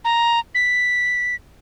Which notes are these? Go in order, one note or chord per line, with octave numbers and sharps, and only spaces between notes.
A#5
B6